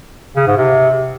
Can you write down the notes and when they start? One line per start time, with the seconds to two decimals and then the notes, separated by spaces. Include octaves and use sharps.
0.36 C#3
0.47 G#2
0.57 C3